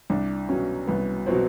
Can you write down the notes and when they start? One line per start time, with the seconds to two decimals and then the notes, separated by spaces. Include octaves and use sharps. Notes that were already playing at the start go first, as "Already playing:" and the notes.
0.10 C2 D4
0.49 B2 F#3 C#4
0.87 C2 B3
1.27 B2 F#3 C4